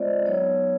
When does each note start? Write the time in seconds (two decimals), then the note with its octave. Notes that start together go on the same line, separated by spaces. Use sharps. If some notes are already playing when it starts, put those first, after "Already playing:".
Already playing: G#3 C4 F4 C5 D5 D#5
0.26 F#3 B3 D#4 C#5